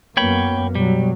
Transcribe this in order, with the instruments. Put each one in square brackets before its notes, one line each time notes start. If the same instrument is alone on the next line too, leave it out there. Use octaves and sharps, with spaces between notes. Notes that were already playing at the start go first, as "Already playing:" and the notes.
[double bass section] F#2 A#3 B3 [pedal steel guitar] C#5 G5 B5
[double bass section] B2 F#3 [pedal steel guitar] G3